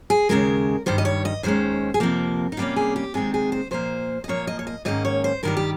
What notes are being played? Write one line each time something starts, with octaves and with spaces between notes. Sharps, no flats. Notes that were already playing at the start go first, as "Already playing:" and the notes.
G#4
D#2 C#3 G#3 A#4
G2 D#3 G3 C5
D#5
C#5
D#5
D#2 D#3 G#3 C#4 C5
G#4
F2 C3 F3 A#3 A#4
D#4
C3 G3 A#3 C#4 F4
G#4
G4
C3 D#3 G#3 C4 G#4
G#4
C5
A#2 F3 A#3 C5
D#5
A#2 F3 A#3 C#5
D#5
C#5
D#5
G#2 D#3 A#3 C#4 D#5
C#5
C5
G2 D#3 G3 A#4
G4